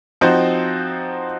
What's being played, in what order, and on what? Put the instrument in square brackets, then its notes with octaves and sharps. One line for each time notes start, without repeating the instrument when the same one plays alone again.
[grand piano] F3 C4 D#4 F#4 C5